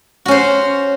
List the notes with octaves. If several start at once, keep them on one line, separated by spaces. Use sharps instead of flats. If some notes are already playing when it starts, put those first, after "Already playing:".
C#4 F#4 C5